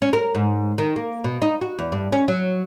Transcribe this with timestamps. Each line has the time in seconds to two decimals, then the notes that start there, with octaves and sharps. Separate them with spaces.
0.02 C#4
0.13 A#4
0.35 G#2
0.78 D#3
0.96 A#3
1.24 B2
1.42 D#4
1.61 F#4
1.79 E2
1.92 G2
2.12 C#4
2.28 F#3